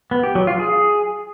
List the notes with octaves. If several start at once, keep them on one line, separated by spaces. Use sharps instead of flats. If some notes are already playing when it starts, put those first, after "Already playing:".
B3
G4
F#3
F4
G#4